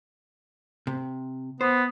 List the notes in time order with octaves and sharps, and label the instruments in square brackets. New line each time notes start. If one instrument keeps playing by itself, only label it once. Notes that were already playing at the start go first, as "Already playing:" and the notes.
[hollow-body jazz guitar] C3
[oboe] B3 [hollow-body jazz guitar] C5